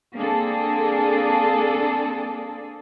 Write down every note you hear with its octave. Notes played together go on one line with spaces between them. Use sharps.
A#3 C4 D4 G#4 A4